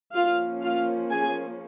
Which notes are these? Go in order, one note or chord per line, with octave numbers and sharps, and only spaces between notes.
F3 A#3 C#4 F4 F5
F4 F5
G#4 G#5